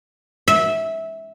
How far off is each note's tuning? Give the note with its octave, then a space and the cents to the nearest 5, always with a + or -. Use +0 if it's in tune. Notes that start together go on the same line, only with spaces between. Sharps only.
E5 -15